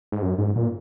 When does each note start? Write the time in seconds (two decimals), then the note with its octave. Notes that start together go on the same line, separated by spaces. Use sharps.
0.12 G#2
0.22 F#2
0.38 G#2
0.56 A#2